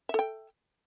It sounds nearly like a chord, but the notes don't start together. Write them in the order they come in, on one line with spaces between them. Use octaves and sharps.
E5 A4 G5